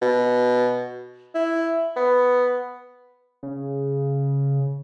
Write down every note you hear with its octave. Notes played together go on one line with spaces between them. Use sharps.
B2
E4
B3
C#3